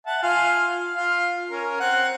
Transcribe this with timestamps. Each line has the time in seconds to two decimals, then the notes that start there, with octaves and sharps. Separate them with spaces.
0.07 E5 F#5 A5
0.23 F4 F5 G#5
0.95 F4 F5
1.50 C#4 A#4
1.80 C4 F#5